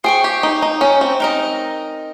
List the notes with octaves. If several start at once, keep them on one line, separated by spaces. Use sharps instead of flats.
G#4 C5 G5 C#6
G4
D#4
D#4
C#4
C4
D#4 A#4 D#5